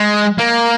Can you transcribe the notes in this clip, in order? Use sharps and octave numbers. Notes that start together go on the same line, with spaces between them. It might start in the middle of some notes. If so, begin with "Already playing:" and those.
Already playing: G#3
A#3